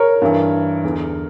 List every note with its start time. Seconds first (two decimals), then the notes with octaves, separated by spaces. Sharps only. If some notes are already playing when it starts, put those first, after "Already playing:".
Already playing: A#4 C#5
0.22 G2 E3
0.84 E2 D3